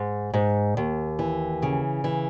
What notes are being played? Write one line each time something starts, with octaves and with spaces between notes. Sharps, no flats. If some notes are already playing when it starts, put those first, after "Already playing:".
Already playing: G#2
G#2
D#2
E3
C#3
E3